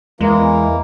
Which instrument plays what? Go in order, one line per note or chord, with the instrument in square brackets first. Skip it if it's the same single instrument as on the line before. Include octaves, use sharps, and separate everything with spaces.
[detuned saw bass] E2 [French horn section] E3 [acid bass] G#3 [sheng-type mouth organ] A#3